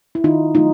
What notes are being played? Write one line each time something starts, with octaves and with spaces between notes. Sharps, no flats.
E4
D#3 D#4 F4
F#3 A3 D#4 F4